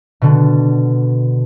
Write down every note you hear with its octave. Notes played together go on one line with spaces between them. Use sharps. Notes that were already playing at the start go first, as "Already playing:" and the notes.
B2 D3